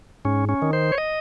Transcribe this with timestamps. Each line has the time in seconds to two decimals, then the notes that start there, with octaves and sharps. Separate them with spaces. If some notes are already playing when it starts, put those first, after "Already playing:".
0.25 G#2 C#4
0.49 C#4
0.62 D#3
0.73 C5
0.92 C#5
0.98 D#5